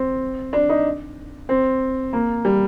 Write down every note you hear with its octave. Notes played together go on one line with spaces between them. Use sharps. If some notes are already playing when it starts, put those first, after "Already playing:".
Already playing: C4
D4
D#4
C4
A#3
G3